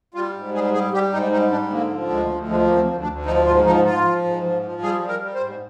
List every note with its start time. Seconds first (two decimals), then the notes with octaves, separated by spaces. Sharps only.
0.14 G3 F4
0.35 G#2
0.54 G3 G#4
0.73 G3 G#4
0.93 G3 G4
1.12 G#2 D#4
1.32 G3 D#4
1.51 G#2 D4
1.70 D3 A#3
1.91 F3
2.10 D2 G#3
2.29 D2
2.48 F3 G#3
2.67 D2 A#3
2.75 C4
2.87 D2
3.00 D4
3.07 D2
3.26 F3 D#4
3.46 G#2 F4
3.65 F3 D#4
3.85 F3 F4
4.04 F3
4.24 G#2
4.43 F3
4.62 F3
4.81 G3 G#4
5.01 G3
5.08 A#4
5.21 G3
5.34 C5
5.40 G#2